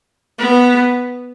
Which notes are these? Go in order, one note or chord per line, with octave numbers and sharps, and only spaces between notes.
B3